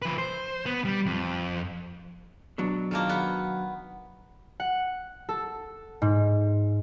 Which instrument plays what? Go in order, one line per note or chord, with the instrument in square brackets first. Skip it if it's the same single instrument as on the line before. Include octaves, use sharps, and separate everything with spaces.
[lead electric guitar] F3 B4
C5
B3
G3
F2
[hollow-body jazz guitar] B2 F#3 D4
[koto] D#3 F3 A#3
B3
[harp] F#5
A4
G#2